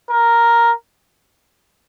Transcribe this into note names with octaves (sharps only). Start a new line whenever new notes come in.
A#4